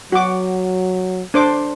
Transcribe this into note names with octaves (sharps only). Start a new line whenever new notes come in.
F#3 F#4 D6
D4 C5 D6